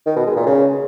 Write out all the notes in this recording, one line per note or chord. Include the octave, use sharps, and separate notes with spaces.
D#3
B2
G#3
A#2
C#3